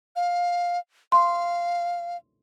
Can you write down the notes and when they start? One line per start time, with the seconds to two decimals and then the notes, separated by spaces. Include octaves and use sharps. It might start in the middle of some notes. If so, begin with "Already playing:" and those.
0.16 F5
1.12 F5 C6